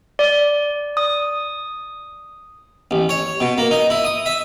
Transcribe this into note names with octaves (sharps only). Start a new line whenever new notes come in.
D5
D#6
A1
C#5
B2
A#3
D#4
E4
D#6
E5